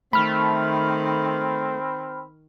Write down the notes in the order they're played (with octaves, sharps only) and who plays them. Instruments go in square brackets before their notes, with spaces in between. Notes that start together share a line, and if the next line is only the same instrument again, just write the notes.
[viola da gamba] D#3 [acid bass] A3 [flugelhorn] C4 [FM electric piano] B5 F6